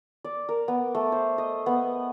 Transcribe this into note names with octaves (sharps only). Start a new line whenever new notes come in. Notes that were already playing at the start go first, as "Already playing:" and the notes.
D5
A#4
B3
A3
C5
D#5
B3